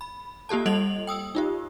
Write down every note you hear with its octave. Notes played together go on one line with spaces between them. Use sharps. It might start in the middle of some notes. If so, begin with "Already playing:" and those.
B5
A#3 F4 G4 A4 A5
G3 A4 D#5 F7 F#7
G5 D#6 E6
D#4 F4 G4